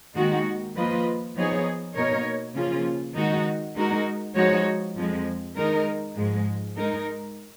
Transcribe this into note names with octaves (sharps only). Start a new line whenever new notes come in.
D#2 D#3 G#3 D#4 F#4
F3 A#3 F4 B4 D#5
F3 B3 D#4 G#4 C#5
B2 A#3 D#4 A#4 C#5
C#3 F3 A#3 C#4 F4
D#3 G#3 D#4 F#4
G#3 D#4 F#4 A#4
F3 G#3 D#4 F#4 C#5
F2 F3 G#3
D#3 G#3 D#4 A#4
G#2 F3 G#3
G#3 D#4 A#4